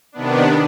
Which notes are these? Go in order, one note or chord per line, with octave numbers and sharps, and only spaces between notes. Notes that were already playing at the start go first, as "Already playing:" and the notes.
C3 D#3 B3 D4